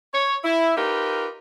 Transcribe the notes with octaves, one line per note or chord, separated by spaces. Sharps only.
C#5
E4
D#4 F4 G4 A#4 B4